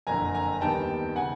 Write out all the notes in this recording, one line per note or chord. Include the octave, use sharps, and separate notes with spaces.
F#1 F2 D3 G#5 A#5
G#5 A#5
D#2 D#3 G3 B3 G5 A5
C#3 F#5 G#5